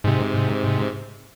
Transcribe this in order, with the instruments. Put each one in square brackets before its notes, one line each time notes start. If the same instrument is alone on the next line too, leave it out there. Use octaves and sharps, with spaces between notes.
[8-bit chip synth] G#2 C3